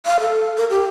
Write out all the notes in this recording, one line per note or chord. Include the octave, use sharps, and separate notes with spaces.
F5
A4
A#4
G4